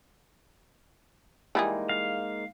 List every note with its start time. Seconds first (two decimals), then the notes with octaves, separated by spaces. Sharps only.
1.55 E3 G3 G#3 A#3 D#4 G#4
1.89 F5